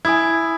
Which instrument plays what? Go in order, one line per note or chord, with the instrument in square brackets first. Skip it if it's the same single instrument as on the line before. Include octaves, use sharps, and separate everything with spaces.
[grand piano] E4 [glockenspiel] G#5 D#6 G#6